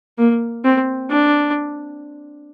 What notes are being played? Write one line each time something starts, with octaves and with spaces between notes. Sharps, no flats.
A#3
C4
D4